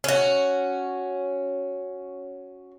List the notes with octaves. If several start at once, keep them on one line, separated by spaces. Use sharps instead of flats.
C#4 F#4